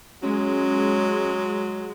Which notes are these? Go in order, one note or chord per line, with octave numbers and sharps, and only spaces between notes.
F#3 G#3 C#4